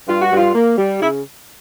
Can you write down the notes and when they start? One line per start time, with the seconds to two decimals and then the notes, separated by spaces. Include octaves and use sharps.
0.08 G2 F4
0.22 F#4
0.31 G2
0.36 F4
0.55 A#3
0.78 G3
1.01 C#3 E4